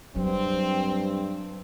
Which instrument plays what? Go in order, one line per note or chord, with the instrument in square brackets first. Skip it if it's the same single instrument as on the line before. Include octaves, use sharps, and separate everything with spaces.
[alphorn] G2 [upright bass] F#3 [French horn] C4